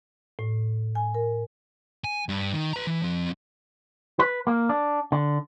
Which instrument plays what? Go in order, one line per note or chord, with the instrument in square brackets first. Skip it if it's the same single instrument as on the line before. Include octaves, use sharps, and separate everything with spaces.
[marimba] A2
G#5
A#4
[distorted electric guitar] G#5
G2
D#3
B4 A#5
E3
F3 C4
[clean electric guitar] B4
A#3
D4
D3